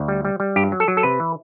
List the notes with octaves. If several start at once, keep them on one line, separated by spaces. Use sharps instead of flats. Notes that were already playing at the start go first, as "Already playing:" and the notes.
Already playing: D2
G3
G3
G3
G2 G4
F#3
A4
F#3
A4
C3 B4
E3